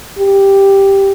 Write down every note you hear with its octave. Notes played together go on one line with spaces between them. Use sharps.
G4